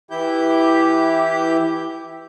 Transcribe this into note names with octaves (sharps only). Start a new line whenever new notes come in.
E3 E4 G4 G6